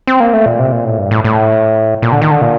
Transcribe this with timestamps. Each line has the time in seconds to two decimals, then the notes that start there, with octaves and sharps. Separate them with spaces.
0.07 C4
0.20 A#3
0.33 A3
0.46 A#2
0.59 C3
0.72 A#2
0.85 A2
0.98 G2
1.11 A2
1.24 A2
2.02 A#2
2.12 D3
2.21 D#3
2.31 D3
2.41 A#2